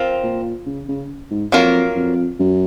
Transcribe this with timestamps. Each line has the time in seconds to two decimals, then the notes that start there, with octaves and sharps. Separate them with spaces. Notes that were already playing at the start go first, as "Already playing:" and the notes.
Already playing: F3 C4 F4 A#4
0.23 A#2
0.66 C#3
0.88 C#3
1.31 G#2
1.52 F2 F#3 A#3 F4 A#4
1.96 F2
2.39 F#2